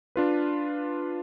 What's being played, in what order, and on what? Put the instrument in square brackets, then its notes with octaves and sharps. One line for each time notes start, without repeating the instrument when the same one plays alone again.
[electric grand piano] D4 F4 B4